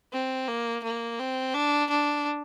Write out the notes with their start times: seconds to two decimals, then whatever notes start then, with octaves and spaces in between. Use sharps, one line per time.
0.13 C4
0.48 A#3
0.83 A#3
1.19 C4
1.54 D4
1.90 D4